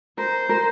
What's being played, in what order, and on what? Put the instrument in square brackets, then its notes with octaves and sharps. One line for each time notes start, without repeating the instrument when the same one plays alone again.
[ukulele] A#4 [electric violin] C5
[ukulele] A#4